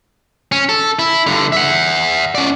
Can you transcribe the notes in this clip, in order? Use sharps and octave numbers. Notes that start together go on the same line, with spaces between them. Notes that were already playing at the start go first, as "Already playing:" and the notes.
C#4
A4
E4
G2 D3
E5 F#5
C#4 D5